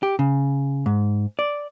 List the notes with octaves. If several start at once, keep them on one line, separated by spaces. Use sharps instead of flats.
G4
C#3
G#2
D5